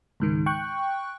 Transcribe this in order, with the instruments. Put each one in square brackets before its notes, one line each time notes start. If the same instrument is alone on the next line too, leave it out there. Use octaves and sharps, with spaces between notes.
[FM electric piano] C#2 G#2 D#3
G5 C#6 F#6